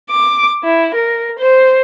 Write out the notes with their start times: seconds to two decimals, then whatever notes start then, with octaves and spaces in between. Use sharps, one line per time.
0.11 D6
0.64 E4
0.95 A#4
1.39 C5